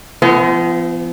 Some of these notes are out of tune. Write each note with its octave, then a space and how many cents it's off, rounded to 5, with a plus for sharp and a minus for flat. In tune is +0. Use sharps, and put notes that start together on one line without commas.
F3 -35 B3 +30